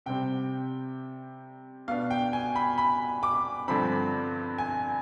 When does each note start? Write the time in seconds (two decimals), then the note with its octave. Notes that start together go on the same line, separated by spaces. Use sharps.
0.06 C3 G3 C4 G5
1.88 B2 B3 D4 F5
2.10 G5
2.33 G#5
2.56 B5
2.78 B5
3.23 D6
3.68 G2 D3 F3 C4 B5
4.58 G#5